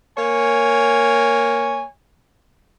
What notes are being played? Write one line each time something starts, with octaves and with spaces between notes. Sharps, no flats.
A#3 C#5 G#5